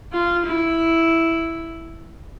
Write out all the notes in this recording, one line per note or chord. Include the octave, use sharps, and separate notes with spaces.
F4
E4